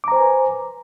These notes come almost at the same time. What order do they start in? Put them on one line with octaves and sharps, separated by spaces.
D6 A#5 C5 G#5 B4